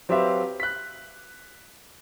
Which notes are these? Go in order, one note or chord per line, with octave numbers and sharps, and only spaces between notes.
F#3 C4 G4 B4 E5 F5
F#6 B6